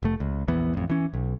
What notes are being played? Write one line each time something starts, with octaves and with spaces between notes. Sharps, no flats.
F1 A3
C#2
A#1 E2 E3 B3
A1 F2
E3 C#4
B1